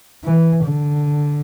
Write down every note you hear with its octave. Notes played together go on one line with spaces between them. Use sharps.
E3
D3